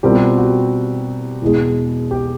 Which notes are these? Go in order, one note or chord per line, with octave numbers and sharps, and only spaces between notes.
B2 G3 C4 F4 G4 A#4
F#4
E2 B2 G#3
G4